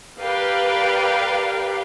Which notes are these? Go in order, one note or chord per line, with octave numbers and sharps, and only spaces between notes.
G4 A#4 B4 D5 F5 G5